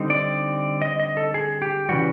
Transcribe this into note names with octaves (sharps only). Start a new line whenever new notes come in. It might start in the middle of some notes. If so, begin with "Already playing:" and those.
Already playing: D3 G3 C4 D#4
D5
D#5
D#5
A4
G#4
G4
C#3 E3 G3 F#4